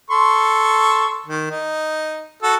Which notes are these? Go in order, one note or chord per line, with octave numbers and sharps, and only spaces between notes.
A4 C6 C#6
D#3
D#4
F#4 A4